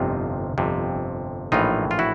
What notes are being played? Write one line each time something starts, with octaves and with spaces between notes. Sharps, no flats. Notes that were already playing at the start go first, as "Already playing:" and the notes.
Already playing: G1 F2 C3 D#4 F4
G1 F2 C3
A#1 A2 E3 D#4 F4
F4
E4 F#4